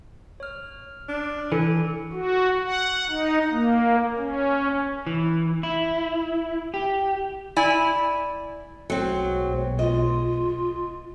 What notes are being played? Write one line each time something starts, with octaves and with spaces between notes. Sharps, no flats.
C#5 F6
D4
E3 A4 C#7
F#4
F#5
D#4
A#3
C#4
E3
E4
G4
E4 D5 G#5
B1 B2 F#3 G#3 C4
F4 D#5